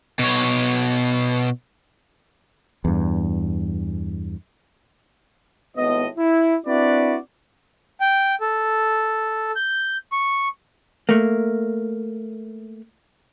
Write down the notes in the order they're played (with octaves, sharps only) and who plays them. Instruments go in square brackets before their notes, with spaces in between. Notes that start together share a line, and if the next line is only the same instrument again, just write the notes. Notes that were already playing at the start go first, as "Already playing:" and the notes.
[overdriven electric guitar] B2 C#5
[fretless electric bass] E2 G2
[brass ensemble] G#1 A2 B3 D#5
E4
C4 D4 E4 F#4 B4 D5
[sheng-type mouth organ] G5
A4
G6
C#6
[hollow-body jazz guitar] A3 A#3